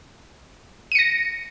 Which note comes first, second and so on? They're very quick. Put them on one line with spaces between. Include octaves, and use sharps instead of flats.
D#7 C#7 A#6